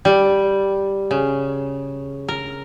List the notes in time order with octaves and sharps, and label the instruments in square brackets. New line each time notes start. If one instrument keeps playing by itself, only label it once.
[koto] G3
C#3
A#4